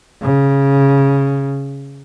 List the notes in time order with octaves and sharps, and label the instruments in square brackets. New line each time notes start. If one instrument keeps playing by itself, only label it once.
[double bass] C#3